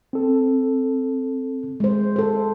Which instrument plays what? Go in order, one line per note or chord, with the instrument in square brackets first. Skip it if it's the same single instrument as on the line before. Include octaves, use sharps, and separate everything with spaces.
[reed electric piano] C4 A4
[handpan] G#3 C5
A4 C5